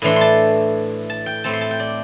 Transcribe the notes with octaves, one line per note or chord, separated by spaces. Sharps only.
A2 E3 A3 D4 C6
A5 C6
A5
G5
A2 A3 C4 A5
C6
A5
G5
D5